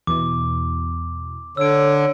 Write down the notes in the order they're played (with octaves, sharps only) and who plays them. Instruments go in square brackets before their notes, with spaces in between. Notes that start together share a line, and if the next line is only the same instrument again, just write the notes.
[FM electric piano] E2 B2 E3 [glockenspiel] D6
[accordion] D3 [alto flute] C#5 [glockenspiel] E6 D7